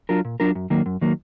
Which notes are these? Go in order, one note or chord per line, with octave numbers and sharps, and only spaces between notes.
F#3 D4 F4 A#4
A#2
F#3 D4 F4 A#4
F#2
D#3 F#3 A#3
F#2
D#3 F#3 A#3